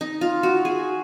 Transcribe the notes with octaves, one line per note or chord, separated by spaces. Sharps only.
D#4
F4
F#4
G#4